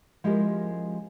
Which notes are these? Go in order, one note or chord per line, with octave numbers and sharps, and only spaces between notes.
F3 G#3 C#4 E4 G4 A#4